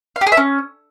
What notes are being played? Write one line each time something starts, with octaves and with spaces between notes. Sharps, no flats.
F5
G4
G#4
E5
C#4